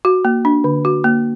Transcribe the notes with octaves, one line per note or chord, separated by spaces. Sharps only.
F#4
A#3
D4
D3
F#4
A#3